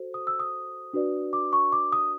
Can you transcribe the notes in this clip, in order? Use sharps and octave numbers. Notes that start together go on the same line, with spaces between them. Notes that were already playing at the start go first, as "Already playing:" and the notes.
Already playing: F#4 A4 C5
D#6
E6
D#6
D4 F#4 B4 D5
D6
C#6
D6
D#6